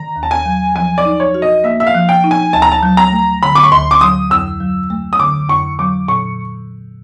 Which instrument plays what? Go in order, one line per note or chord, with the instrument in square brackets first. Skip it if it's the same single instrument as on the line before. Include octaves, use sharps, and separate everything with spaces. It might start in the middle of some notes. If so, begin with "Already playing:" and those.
Already playing: [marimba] D#3 [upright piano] A#5
[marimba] D#2
[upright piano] A5
G#5
[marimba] F#3
[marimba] F3 [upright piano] G#5
[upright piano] D5
[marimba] D#4
[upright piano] C#5
[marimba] F#4
[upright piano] D#5
[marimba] A#3 [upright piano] E5
[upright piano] E5
F5
[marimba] F3
[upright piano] G5
[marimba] D#4
[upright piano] G#5
[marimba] D2 [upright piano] A5
[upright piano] A#5
A5
[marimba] F#3
[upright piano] A#5
[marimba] A3
[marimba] D3 [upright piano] B5
[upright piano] D6
C#6
[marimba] D2 [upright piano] C6
[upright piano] D6
[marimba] F#3 [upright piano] D#6
[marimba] F2 [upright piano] E6
[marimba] F#3
A3
[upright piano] D#6
[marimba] D3 [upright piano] D6
[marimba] F2 [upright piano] C#6
[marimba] F#3 [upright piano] D6
[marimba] A#2 [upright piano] C#6